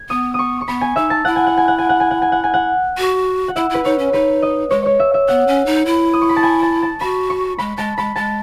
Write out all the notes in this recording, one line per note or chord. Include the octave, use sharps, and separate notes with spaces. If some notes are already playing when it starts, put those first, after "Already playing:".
Already playing: G#6
B3 D#6
C#6 D#6
C#6
B3 B5
G#5
D#4 E5
A5
E4 F#5
G#5
F#5
G#5
F#5
G#5
F#5
G#5
F#5
G#5
F#5
G#5
F#5
F#4
F#5
E4 E5
E4 B4
D#4 C#5
C#4
D#4 B4
D#5
G#3 C#5
C#5
E5
E5
B3 F#5
C#4
D#4
E4
D#6
C#6
B5
A5
G#5
A5
A5
F#4 B5
C#6
G#3 B5
G#3 A5
G#3 B5
G#3 A5